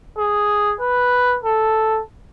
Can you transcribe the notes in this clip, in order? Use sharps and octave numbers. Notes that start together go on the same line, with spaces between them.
G#4
B4
A4